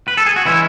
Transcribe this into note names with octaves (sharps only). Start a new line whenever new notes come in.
B4
A4
G#4
F#4
E3 G#3 C#4 E4